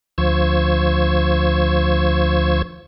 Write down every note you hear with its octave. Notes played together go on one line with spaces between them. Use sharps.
D2 F3 C5 C#6 E6 G#6